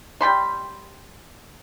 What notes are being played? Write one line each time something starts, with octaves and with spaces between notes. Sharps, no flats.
G3 G5 B5 C6